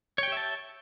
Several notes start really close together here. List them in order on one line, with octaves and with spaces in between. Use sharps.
C#5 G5 G4 E5 A5